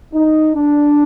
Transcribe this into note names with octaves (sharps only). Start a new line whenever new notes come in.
D#4
D4